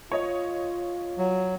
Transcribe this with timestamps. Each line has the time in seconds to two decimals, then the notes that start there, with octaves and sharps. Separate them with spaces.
0.12 F4 C#5 D#5
1.18 F#3